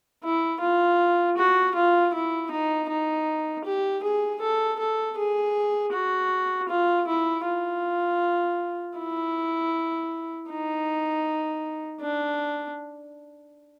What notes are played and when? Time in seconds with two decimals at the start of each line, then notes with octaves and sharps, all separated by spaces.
0.24 E4
0.61 F4
1.37 F#4
1.75 F4
2.14 E4
2.51 D#4
2.89 D#4
3.65 G4
4.03 G#4
4.41 A4
4.79 A4
5.18 G#4
5.93 F#4
6.69 F4
7.07 E4
7.45 F4
8.98 E4
10.49 D#4
12.01 D4